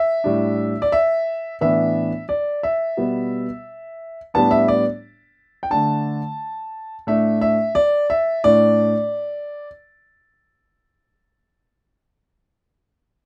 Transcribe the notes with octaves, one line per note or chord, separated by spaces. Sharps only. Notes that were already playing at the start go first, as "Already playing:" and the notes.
Already playing: E5
A2 G3 D4
D5
E5
A2 E3 B3 D4 E5
D5
E5
B2 G3 B3
A2 G3 B3 D4 A5
E5
D5
G5
D3 A3 D4 A5
A2 A3 D4 E5
E5
D5
E5
A2 A3 D4 D5